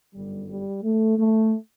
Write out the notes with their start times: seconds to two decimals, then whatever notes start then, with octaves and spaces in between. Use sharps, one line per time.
0.14 G1 F#2 D3 G3
0.49 G3
0.83 A3
1.17 A3